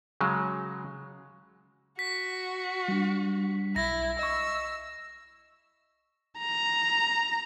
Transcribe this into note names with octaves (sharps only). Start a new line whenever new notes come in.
C#3 F#3 G#3
F#4 B6
G3 D4
B1 E4 A#6
D#5 C#6 E6
A#5